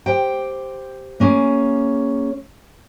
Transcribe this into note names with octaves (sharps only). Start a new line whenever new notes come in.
G4 C5 G5
A#3 C#4 G#4